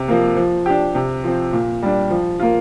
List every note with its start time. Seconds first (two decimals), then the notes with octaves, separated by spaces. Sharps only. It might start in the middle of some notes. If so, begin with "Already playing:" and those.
Already playing: C3
0.08 F3 A#3
0.36 F3
0.66 D4 G4
0.95 C3
1.24 F3 C4
1.53 A#2
1.83 G3 D4
2.11 F3
2.40 A#3 F4